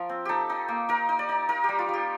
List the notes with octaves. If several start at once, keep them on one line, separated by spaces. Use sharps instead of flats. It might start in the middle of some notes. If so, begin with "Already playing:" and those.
Already playing: F3 F4 A#4
C4
D#4 G4 A4
D#4
A#3
D#4 A#4
D#4
D5
D#4
D#4 A#4
G3 G4
F4
G3 G4